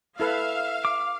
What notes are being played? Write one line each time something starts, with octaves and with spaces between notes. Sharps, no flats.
E4 A4 B4 E5 F5
D6